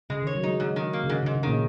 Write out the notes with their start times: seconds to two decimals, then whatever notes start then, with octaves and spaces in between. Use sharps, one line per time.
0.10 C#3 G#3
0.22 D#3 C#5
0.35 F#3
0.43 G#3 D#4
0.60 G#2 G#3
0.76 D#3
0.93 A#3
1.04 C#3
1.09 G#2 D#3
1.23 C#3
1.26 G#2
1.35 C#3
1.43 A#2 D#3